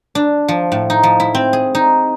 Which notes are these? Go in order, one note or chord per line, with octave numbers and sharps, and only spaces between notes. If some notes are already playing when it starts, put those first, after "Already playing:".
D4
F3
A2
D#4
F3
E4
C4
G#4
D#4